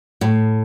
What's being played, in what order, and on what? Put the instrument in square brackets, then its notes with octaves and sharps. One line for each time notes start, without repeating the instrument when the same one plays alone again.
[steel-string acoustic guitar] A2